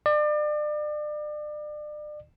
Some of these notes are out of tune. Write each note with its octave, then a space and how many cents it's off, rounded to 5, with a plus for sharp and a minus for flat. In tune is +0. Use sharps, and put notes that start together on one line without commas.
D5 +35